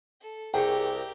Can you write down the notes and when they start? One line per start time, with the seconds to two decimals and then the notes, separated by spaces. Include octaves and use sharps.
0.21 A4
0.54 C2 G4 G#4 A#4 C#5 G5